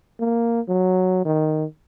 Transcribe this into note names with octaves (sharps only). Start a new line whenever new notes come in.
A#3
F#3
D#3